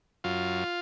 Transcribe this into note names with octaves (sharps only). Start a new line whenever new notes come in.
F#2 F4